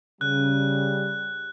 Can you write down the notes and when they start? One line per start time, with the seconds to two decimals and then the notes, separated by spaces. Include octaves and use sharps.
0.21 C#3 G3 F#6